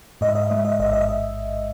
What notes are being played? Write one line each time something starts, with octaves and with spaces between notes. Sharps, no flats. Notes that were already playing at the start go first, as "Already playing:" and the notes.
G#2 D#5
E5
D#5
E5
G#3 D#5
E5
D#5
E5
A1 D#5
E5
D#5
E5
D#5